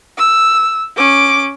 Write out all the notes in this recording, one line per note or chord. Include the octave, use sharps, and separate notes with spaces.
E6
C#4 D6